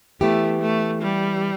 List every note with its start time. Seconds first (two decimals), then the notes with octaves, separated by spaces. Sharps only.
0.21 E3 A3 B3 E4 G4
0.62 A3
1.02 G3